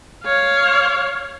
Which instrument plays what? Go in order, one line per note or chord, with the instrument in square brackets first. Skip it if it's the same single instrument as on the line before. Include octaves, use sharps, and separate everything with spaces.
[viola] C#5 F5